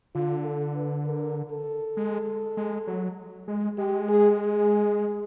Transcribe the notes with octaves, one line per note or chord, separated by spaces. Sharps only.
D3 F4
A4
B4
A#4
A4
G#3
G#3
F#3
G#3
G#3 G4
G#4
G#4